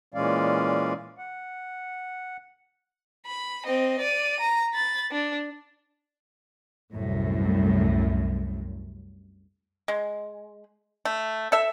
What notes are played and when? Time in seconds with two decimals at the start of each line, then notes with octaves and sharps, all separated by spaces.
0.14 A#2 E3 G#3 C#4 D5 F5
1.18 F#5
3.26 B5
3.66 C4 D#5
4.00 D5 D#7
4.40 A#5
4.73 B5 A6
5.11 D4
6.93 C2 F#2 A2
9.88 G#3
11.05 A3
11.52 A4 E5